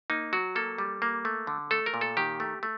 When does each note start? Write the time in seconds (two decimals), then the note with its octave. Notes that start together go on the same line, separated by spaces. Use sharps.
0.10 A#3 D#4
0.33 F#3 F#4
0.56 A#3 A4
0.78 G3
1.02 A#3
1.25 A3
1.47 D3
1.71 A3 A4
1.86 A#4
1.94 A#2
2.01 A4
2.17 D#3 G4
2.40 A3
2.63 A3